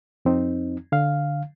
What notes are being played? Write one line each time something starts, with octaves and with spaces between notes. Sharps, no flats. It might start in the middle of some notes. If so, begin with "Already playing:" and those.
F2 C4 D#4
D3 F5